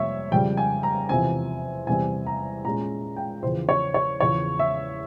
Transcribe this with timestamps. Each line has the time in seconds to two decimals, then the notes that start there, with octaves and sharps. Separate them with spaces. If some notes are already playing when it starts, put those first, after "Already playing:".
Already playing: F2 C3 G3 A#3 C#5 E5
0.31 F2 C#3 G3 G5
0.57 G#5
0.83 A#5
1.09 E2 C3 F3 C4 G#5
1.87 E2 C3 G3 C4 G#5
2.26 A#5
2.65 A#2 G#3 C#4 A#5
3.16 G5
3.42 E2 C#3 F3 C5
3.69 C#5
3.94 C#5
4.20 E2 C#3 F3 C#5
4.59 E5